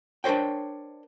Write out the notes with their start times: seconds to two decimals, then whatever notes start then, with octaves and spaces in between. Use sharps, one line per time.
0.24 D4 A#4 C5 C#5 G5